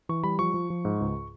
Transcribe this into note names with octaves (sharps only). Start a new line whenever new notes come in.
E3 C#6
G3 B5
F3 C#6
F3
F3
G#2
C#2